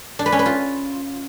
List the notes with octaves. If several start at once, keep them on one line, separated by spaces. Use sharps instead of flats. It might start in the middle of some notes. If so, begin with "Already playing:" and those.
D4
B4
C#4
B4
F4